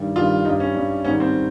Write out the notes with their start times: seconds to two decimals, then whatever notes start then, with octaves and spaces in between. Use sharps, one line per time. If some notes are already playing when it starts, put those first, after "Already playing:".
Already playing: G2 D#3 G3
0.16 G2 D#3 G3 F4
0.45 G2 G3 D#4
0.60 C#4
0.75 G2 G3
1.05 G#2 D#3 G3 C#4
1.20 C4